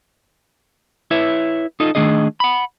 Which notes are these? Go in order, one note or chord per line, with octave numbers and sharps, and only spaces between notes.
E4 B4 C#5 E5
D#4 F4 A4 D#5
D#3 A3 D4 G#4 D#5
F#5 B5